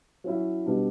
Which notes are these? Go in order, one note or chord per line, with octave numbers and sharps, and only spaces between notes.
F#3 C#4 E4
B2 G3 D4